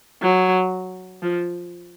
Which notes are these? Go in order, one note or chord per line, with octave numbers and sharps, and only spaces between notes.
F#3
F3